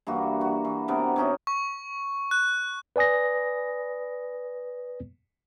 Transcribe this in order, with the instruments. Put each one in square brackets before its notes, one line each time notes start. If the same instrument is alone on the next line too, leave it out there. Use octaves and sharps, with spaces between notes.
[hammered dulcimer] G2 E3 A#3 F#4
F#4
E3
C3 B3 D4 A#4
C3 C#4 D#4 F#4
[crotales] C#6
F#6
[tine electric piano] B4 D5 G#5 D#6 A#6